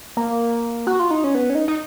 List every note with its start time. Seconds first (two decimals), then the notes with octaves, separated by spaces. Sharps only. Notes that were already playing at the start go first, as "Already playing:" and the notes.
0.17 A#3
0.87 F#4
1.00 F4
1.11 D#4
1.24 C#4
1.35 B3
1.50 C#4
1.55 D#4
1.68 D#4